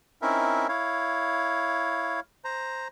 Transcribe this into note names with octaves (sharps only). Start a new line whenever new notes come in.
C4 C#4 D#4 E4 A#4 E5
E4 C#5 F5
C5 A#5